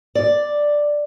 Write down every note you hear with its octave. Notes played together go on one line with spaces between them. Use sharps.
D5